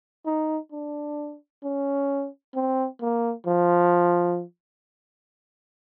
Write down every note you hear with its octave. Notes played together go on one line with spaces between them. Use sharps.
D#4
D4
C#4
C4
A#3
F3